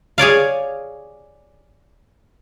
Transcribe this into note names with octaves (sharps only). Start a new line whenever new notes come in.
G#4 C#5 D5 F5